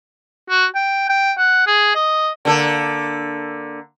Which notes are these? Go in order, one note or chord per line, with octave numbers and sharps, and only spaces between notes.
F#4
G5
G5
F#5
G#4
D#5
D3 A#3 A4